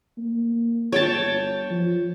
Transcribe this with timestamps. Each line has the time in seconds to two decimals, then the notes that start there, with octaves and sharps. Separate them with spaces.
0.18 A#3
0.92 G1 C#5 G5 A5
1.71 F3